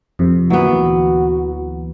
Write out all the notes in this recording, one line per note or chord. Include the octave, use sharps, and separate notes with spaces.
F2 C3
D2 A#2 E3 F#3 B3 F#4